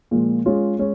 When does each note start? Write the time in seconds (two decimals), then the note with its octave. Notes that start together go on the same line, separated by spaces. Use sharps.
0.11 A#2 F3 G#3
0.46 G#3 C#4 F4
0.79 G#3 C#4